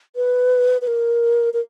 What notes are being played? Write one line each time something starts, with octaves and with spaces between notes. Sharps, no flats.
B4
B4
A#4
A#4